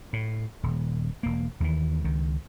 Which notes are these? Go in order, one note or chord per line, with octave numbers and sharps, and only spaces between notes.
A2
D#1
E1 A#3
D#2 D#3 E3
C#2 D#3